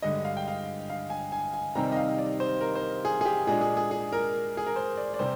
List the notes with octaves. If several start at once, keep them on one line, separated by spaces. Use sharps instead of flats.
G2 D3 G#3 D#5
F5
G5
F5
F5
G#5
G#5
G#5
C3 D#3 G3 C4 D#4 A#5
D#5
F5
D5
C5
A#4
C5
G#4
G#4
G4
A#2 G#3 D4 G#4
G#4
G#4
G#4
A#4
G#4
A#4
C5
D5
D5
C3 G3 C5